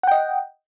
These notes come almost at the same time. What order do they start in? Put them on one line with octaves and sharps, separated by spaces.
F#5 G5 D#5